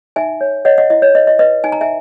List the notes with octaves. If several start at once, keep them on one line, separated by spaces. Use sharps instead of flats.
D#4 E5 G#5
C#5
C#5 D#5 F#5
D#5 F#5
E4 D#5
C#5
B4 D#5
D#5
B4 D#5
D#4 G#5
A#5
E5 G#5